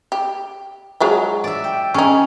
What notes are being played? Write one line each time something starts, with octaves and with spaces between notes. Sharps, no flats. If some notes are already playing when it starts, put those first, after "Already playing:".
G4
F3 F#3 G#3
D5 E5
G5
G#3 C#4 D#4